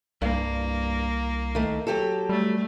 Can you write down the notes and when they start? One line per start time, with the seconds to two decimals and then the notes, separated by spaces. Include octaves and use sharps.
0.22 C2 G2 A#3
1.55 D#3 A3
1.87 F#3 G4 A4
2.29 G3 A3